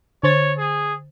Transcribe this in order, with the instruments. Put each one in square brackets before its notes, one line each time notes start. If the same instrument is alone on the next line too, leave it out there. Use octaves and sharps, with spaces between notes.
[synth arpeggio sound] D3 C5 A6 [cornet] C#5
[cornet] G#4